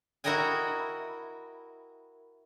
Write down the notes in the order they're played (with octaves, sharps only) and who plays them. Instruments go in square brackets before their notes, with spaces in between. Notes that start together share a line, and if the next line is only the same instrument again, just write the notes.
[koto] E4 F#4 A#4 D#5 G5 G#5